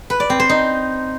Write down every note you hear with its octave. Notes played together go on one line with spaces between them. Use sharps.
B4
D5
C4
C5
D#4